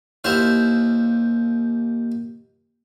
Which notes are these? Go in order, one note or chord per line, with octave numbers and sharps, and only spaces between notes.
D#2 E4 C5 F5